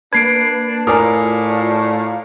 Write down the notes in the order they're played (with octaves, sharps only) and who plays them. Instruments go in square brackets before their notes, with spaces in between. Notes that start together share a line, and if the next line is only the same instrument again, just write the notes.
[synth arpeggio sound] A#3 B4 [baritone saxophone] D4 [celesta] G#6 C7 D7
[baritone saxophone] A2 [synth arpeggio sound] F4 D5 F5 [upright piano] A#4 [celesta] G#5 D6 D#6